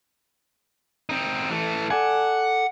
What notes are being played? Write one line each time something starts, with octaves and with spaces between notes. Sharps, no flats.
C4 D#4
E3 A3
A4 D5 F#5 G#5